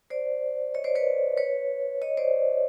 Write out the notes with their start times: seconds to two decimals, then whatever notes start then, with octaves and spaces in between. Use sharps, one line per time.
0.10 C5 D5
0.74 C#5 D#5
0.84 C5 D5
0.95 B4 C#5
1.37 B4 C#5
2.02 C#5 D#5
2.17 C5 D5